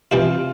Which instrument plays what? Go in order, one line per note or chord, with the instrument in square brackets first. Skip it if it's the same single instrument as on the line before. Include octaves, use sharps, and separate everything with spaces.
[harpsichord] E3 G3 C4 E4 [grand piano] F4